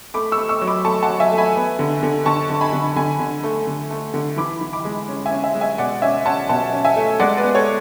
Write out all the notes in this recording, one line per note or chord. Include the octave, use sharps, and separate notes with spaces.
A3 B5 D6
C#6 E6
A3
C#6 E6
F#3
B5 D6
A3 A5 C#6
F#5 A5
F#3
E5 G#5
A3
G#5 B5
B3
D3
D3
D3 A5 C#6
D3
G#5 B5
D3
D3 G#5 B5
D3
A3
D3
A3
D3
E3 B5 D6
E3
B5 D6
G#3
C#4
E5 G#5
C#4
E5 G#5
G#3
E5 G#5
B2 D5 F#5
C#4 E5 G#5
C#4 F#5 A5
B2 F#5 A5
C#4
E5 G#5
A3
G#3 D5 F#5
B4 D5
B3
A4 C#5